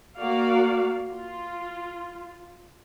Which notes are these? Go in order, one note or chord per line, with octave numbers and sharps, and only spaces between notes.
A#3 F#4 D5 F5
F4